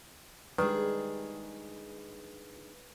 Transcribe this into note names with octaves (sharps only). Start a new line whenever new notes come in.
D#3 G3 G#3 D4 D#4 G#4 B4